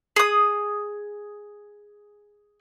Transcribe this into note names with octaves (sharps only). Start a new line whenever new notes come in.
G#4 D#6